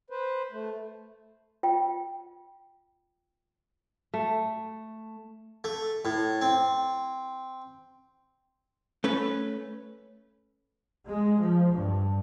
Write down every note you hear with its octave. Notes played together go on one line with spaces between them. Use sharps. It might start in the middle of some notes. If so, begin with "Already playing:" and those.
B4 C5
A3
F4 G5
A3
A3
A2
C4
A3 C#4 B4
G#3
F3
G2